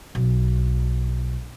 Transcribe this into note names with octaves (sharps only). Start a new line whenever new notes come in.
B1